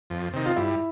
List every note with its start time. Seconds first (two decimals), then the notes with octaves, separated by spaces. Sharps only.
0.10 F2
0.33 C3 D#3
0.46 F4
0.56 G2 E4